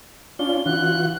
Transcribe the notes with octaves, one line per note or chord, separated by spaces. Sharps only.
C#4 D4 F4 G7
E3 F4 F#4 F#6